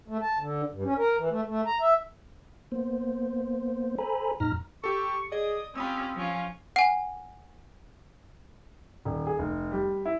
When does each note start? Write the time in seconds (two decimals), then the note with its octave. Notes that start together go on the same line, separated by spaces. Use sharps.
0.08 A3
0.22 A5
0.39 D3
0.72 G2
0.85 C#4
0.98 A#4
1.18 E3
1.31 A3
1.47 A3
1.67 A#5
1.81 E5
2.72 A#3 B3 C5
3.98 A4 C5 G#5 A#5 B5
4.40 F2 A#2 D#4 A#5 F6 A#6
4.84 G4 A4 C#6
5.32 G#4 D5 D#5 D#6
5.75 C4 C#4 F4 G4 B5 D#6 E6
6.15 F3 C#4 F4
6.76 F#5 G#5
9.05 D#1
9.27 G#4
9.39 F1
9.71 G3
10.06 E4